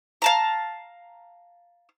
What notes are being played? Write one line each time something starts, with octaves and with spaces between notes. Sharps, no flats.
F5 A5 A#5